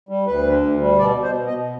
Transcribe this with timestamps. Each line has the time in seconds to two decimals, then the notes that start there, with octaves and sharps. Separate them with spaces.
0.09 G3
0.27 D2 B4
0.45 D3
0.63 D2
0.81 G3
0.99 B2 D5
1.17 B2
1.23 C5
1.35 B2
1.47 D#5
1.52 B2